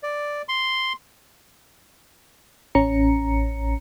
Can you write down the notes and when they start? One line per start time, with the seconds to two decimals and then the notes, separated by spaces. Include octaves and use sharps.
0.03 D5
0.48 C6
2.75 A1 C#4 A#5 C#7